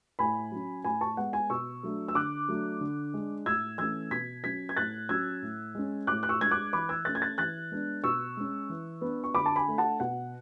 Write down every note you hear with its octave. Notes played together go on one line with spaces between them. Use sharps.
A2 G#5 B5
F#3 C#4
A2 G#5 B5
A5 C#6
G#3 B3 F#5
G#5
B2 C#6 E6
F#3 A3 D4
E6
D3 D6 F#6
F#3 A3 D4
D3
G#3 D4
A2 E6 G#6
E3 A3 C#4 E6 G#6
B2 G#6 B6
F#3 C#4 G#6 B6
G#6
A2 F#6 A6
F#3 C#4 E6 G#6
A2
G#3 C#4
A2 D6 F#6
F#6
C#6 E6
G#3 D4 G#6
D6 F#6
E3 B5 D6
E6 G#6
A3 C#4 F#6 A6
G#6
F#6 A6
E3 F#6 A6
G#3 B3 D4
B2 C#6 E6
G#3 C#4
E3
B3 D4
C#6
D3 B5 D6
A5
G#5 B5
A3 D4
F#5 A5
B2 F#5